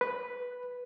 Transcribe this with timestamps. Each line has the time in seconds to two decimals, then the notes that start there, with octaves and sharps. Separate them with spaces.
0.01 B4